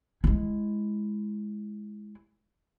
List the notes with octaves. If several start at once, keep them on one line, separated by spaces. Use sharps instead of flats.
G#3 E4